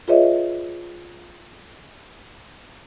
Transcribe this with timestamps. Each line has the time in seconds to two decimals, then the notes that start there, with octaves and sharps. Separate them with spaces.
0.08 F4 G#4 B4 C#5 D#5 E5